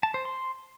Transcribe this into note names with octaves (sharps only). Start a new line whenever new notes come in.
A5
C5
C6